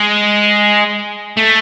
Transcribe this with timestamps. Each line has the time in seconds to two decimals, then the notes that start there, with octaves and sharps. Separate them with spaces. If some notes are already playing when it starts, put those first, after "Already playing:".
Already playing: G#3
1.37 A3